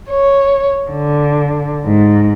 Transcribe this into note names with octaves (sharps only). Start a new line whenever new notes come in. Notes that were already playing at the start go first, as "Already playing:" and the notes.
C#5
D3
G#2